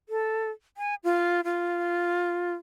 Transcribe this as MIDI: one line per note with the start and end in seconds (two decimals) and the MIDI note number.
0.09 0.50 69
0.77 0.95 80
1.04 1.41 65
1.44 2.54 65